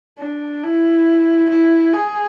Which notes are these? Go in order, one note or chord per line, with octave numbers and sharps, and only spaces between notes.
D4
E4
E4
G#4